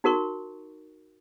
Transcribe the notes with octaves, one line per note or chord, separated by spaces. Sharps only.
D#4 F#4 A#4 C#6